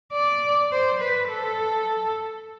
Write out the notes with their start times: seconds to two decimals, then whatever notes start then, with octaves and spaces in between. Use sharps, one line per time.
0.13 D5
0.72 C5
1.01 B4
1.29 A4